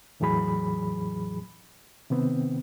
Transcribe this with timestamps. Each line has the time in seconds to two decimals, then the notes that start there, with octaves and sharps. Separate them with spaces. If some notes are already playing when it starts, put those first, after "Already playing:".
0.20 E2 A2 E3 F#3 G#4 B5
2.10 C3 D#3 B3 C4